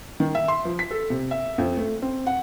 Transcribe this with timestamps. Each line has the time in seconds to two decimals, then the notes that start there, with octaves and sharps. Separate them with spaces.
0.20 D#3
0.35 E5
0.48 C6
0.65 F3
0.79 B6
0.91 A4
1.10 C3
1.31 E5
1.58 F2
1.77 A3
2.02 C4
2.27 F#5